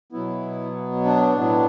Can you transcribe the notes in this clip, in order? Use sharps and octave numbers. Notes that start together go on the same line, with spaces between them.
B2 F#3 B3 E4
D4
A2 F#3 B3